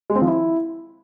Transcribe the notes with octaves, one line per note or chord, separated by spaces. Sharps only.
G#3
C4
F3
E4